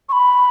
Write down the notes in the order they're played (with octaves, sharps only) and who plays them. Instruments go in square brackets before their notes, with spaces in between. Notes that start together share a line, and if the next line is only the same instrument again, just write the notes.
[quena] C#6
B5